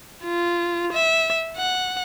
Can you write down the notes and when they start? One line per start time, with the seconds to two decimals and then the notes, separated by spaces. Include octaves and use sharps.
0.25 F4
0.93 E5
1.57 F#5